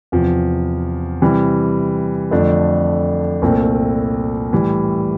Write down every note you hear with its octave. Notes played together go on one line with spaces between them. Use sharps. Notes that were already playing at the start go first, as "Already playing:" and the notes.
E2 C3 F3
C3 E3 G3
F2 D3 F3 A3 D4
C2 A#2 A3 C4
A2 E3 G3